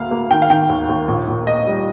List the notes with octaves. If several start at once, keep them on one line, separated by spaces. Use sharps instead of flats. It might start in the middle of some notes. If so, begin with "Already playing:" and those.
Already playing: D2 A#3 F5
A#3
D#3 G5
F5
D#3 G5
D#2
D#2
A#1
A#1
A#3 D#5
G3